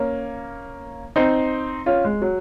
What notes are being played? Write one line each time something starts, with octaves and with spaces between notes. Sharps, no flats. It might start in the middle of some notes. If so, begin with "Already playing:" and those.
Already playing: A#3 C#4
C4 D#4
C#4 F4
G#3
F#3